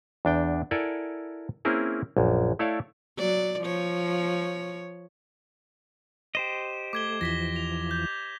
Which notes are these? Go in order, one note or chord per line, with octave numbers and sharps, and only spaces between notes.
E2 D4 G5
E4 A4 A#4 D5 F#5 G#5
A#3 C4 C#4 E4 G#4 A#4
A#1 F#2
A3 E4 A4 C#5 D5 F5
F#3 D5
F3 C#5
G4 C5 D#5 E7
A3 D6 G#6 G7
E2 E3 F3 A#6 B6 G7
F7
G6